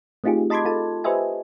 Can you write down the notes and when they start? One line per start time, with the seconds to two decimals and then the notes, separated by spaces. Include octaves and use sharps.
0.24 A3 C4 D#4 F4 G4 G#4
0.50 D#5 A5 B5 C6 D6 G#6
0.65 F4 A4 A5
1.04 G4 B4 C5 D#5 E5 G#5